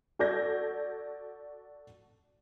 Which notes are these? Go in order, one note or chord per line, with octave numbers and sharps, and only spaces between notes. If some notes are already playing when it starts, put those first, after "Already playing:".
F#4 A4 D5 G6 G#6 A#6